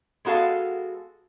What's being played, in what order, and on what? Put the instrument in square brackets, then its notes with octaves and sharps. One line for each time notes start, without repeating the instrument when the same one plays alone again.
[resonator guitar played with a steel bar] G#3 B3 F#4 A4 F5